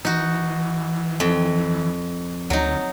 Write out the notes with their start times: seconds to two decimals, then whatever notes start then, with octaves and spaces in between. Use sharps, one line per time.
0.05 E3 D#4 F#4
1.20 F2
2.50 D2 F#3 D#4